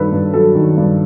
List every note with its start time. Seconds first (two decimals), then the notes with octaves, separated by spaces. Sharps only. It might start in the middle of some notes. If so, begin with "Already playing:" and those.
Already playing: G2 D#3 F#3 A4 B4
0.12 G2
0.33 F#3 A4
0.55 D#3
0.77 G2